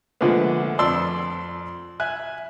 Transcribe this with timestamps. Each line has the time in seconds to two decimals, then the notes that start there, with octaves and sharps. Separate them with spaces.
0.21 A#2 D3 F3 G#3 A3 B3
0.79 F2 D5 A5 C6 E6
2.00 E5 G#5 F#6